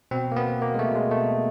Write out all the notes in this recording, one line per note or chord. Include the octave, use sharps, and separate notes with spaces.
B2 C4
A#3
B2 B3
B2 A#3
G#3
A3
B2
G#3
B2 A3